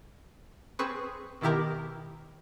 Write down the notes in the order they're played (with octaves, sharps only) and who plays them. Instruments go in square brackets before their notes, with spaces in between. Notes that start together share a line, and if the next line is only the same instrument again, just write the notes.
[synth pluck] C4 G#4 B4 C#6
B2 D#3 E4 G4 A#4